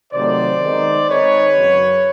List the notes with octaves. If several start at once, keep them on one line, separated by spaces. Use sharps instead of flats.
C3 D#3 F#3 A3 C4 C5 D5
D#3 G#3 B3 D#4
D#3 G#3 C4 D#4 B4 C#5
F#2 C#3 F#3